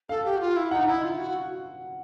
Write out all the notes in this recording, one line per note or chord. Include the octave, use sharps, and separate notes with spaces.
A4 F5
G4
F#4
F4
E4
D#4 F#5
E4
F4
F#4